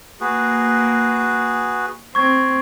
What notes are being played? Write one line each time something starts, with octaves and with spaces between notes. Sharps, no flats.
A#3 F#4 G#4 B4
C4 C#6 G#6